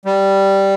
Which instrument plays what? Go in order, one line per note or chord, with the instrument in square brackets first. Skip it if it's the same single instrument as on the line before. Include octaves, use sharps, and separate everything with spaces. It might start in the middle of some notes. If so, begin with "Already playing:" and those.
[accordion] G3